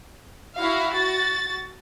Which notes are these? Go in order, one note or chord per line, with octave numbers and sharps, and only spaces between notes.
E4 F#4 F5
F#4 A6